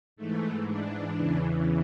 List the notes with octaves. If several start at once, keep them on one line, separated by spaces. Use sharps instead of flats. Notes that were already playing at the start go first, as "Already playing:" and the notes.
G#2 E3 A3
D4
E2 C#3 E3